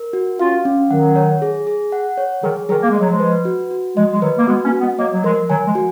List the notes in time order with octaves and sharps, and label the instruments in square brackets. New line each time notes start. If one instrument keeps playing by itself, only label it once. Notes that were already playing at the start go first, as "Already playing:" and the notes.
Already playing: [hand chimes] A#4
F#4
[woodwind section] C#4 F4 [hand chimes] F5
[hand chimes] C#4
[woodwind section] D#3 F#3 [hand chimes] F#5
[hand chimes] C#5
G#4
G#4
F#5
C#5
[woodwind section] D#3 F#3 [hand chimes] G#4
[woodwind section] D#3 F#3 [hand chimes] G#4
[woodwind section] A#3
[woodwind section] G#3 [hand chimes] D#5
[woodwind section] F#3
F3 G#3
[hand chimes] B4
F#4
F#4
[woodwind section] F3 G#3 [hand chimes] D#5
[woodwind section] G#3
[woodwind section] D#3 F#3 [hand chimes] B4
[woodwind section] A#3
[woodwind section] G#3 B3 [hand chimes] F#4
[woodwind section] A#3 C#4
[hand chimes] F#4
[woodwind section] G#3 B3
[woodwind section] F#3 A#3 [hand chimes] D#5
[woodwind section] F#3
[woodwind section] F3 G#3 [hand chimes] A#4
[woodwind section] D#3 F#3 [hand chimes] G#5
[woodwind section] F3 G#3
[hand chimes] F#4